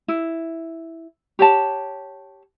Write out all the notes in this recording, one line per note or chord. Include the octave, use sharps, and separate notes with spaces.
E4
G4 C#5 A5